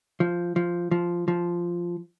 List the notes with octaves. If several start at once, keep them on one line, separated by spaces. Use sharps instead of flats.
F3
F3
F3
F3